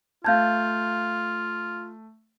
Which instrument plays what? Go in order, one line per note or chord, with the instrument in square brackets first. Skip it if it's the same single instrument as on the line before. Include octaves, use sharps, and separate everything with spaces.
[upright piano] A3 A5 [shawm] F4 [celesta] F5 G6 G#6